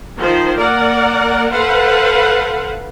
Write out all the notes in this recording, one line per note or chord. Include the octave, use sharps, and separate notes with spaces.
D#3 F3 C5
A#3 A#4 D5 F#5
A4 B4 C5 F5 F#5